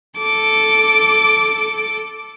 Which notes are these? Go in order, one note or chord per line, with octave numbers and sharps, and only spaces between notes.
A4 D6